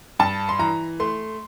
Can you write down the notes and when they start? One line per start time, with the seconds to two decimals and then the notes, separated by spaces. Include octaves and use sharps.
0.19 G2 A5
0.49 C6
0.59 E3 A#5
1.00 A3 C6